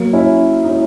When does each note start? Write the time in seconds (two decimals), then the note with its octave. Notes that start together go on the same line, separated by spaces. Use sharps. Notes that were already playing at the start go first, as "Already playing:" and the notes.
Already playing: F#3 A#3
0.13 C#4 E4
0.64 D#4
0.69 C#4 E4